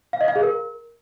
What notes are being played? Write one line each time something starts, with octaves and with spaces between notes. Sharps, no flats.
F5
D#5
F5
G#4
A#4